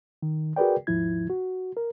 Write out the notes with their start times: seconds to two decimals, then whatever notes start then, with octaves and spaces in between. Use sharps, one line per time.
0.22 D#3
0.56 F#4 G#4 A#4 B4 D5 G5
0.87 D#2 G#2 F3 E4 G#6
1.30 F#4
1.77 A#4